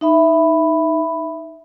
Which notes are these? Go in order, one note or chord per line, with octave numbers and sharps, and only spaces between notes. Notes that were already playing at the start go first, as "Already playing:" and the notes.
D#4 E5 B5